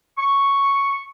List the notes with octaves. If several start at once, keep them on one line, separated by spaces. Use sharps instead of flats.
C#6